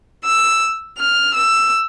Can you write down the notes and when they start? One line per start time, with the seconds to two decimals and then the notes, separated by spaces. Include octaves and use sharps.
0.23 E6
0.97 F6
1.33 E6